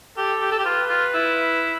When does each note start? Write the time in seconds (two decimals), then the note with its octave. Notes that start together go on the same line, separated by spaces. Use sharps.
0.17 G4 A4
0.41 G4
0.51 A4
0.59 G4
0.65 F4 B4
0.89 F4
1.14 E4